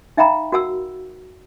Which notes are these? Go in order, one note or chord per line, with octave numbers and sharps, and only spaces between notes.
D#4 E5 F5 G5 A#5 B5
F#4 A#4 F#5 E6